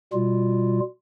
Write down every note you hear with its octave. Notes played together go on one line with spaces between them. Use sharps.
B2 G3 F4